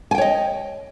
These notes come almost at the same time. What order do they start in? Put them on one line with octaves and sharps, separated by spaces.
G#5 G5 C#5 D#5